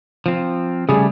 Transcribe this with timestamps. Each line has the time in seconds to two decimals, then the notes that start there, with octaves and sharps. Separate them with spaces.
0.26 F3 C4
0.89 C#3 G3 A3 G#4